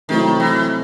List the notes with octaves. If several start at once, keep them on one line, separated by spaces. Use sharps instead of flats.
C3 D#3 F#3 A3 C4 E4
E3